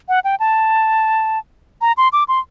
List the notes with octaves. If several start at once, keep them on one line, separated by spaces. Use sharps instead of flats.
F#5
G5
A5
A#5
C6
D6
C6